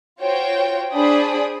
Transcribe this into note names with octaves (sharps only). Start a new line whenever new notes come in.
F4 F#4 C5 C#5 G5
D4 G#4 C5 D5 B5 D#6